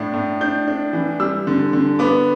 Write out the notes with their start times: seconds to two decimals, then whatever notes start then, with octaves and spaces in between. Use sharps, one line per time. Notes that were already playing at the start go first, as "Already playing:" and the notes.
Already playing: A2 D4
0.13 A2
0.41 D4 G6
0.68 D4
0.93 E3
1.20 G3 E6
1.47 D3
1.73 D3
1.99 B3 D6